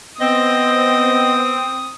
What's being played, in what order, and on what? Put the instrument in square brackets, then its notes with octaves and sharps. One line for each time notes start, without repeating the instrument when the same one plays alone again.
[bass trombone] B3 [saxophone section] C4 [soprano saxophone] D#5 [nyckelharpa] D#6